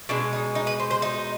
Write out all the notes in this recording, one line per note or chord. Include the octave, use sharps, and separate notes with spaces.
B2 G#3 D4
D#4
D#4
B4
C5
C5
D#4